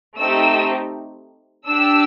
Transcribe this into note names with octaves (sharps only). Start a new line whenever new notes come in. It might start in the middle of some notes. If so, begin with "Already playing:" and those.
A3 C4 D#4 G4 E6
D4 G4 E6